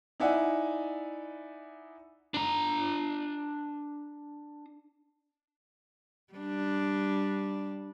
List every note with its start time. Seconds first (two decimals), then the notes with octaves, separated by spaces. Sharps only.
0.20 D#4 E4 D5 E5 F#5 G#5
2.34 D4 A#5
6.34 G3 D4